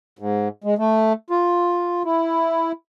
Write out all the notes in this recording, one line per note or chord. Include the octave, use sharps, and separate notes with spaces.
G#2
G#3
A3
F4
E4